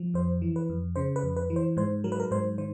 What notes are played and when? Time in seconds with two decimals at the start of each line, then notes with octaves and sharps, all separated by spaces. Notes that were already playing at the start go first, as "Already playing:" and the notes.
Already playing: F3
0.14 F2 C5
0.42 E3
0.56 B4
0.69 F2
0.96 C#3 C5
1.16 B4
1.23 F2
1.36 B4
1.50 E3
1.56 C5
1.77 G#2 C5
2.04 F#3 A#4
2.12 B4
2.20 A#4
2.31 G#2 C5
2.58 D#3 C5